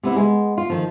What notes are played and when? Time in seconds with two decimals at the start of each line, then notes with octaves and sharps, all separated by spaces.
0.03 C3 B3 E4
0.16 G#3 B3
0.58 F4
0.70 D#3 F3